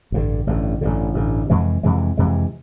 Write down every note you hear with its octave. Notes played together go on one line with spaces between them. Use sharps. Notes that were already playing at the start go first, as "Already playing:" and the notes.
A1 G2 D3
A1 G2 D3
A1 G2 D3
A1 G2 D3
F2 C3 E3 G#3
F2 C3 E3 G#3
F2 C3 E3 G#3